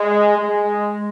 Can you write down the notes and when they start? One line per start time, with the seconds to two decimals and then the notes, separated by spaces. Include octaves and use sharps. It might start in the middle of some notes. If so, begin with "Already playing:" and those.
Already playing: G#3
0.39 G#3